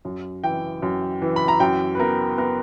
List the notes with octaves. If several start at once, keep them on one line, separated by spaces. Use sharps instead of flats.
F#2
E3 G5
F#2
E3
B5
A#5
F#2 G5
B4
B3 A#4
B3 A#4